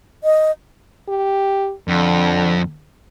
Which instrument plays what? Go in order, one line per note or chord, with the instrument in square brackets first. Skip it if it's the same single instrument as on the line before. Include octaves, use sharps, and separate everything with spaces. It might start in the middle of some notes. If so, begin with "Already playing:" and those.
[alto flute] D#5
[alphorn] G4
[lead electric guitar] F2 [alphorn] D3